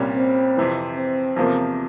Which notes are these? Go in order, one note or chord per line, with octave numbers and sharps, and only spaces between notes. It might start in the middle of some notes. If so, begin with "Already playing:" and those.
Already playing: C2 A#2 G3 C#4
C4
F2 C3 E3
C4
E2 C3 F3 A#3